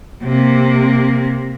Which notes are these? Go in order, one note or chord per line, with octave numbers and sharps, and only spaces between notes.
C3 A#3